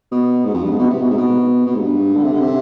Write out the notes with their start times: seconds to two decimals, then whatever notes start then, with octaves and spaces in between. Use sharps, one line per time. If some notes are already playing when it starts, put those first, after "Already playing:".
0.12 B2
0.45 G#2
0.54 F2
0.63 G2
0.71 G#2
0.79 B2
0.90 C3
1.01 B2
1.10 G#2
1.18 B2
1.67 B2
1.75 G#2
1.81 G2
2.16 D3
2.24 C3
2.33 D3
2.41 C3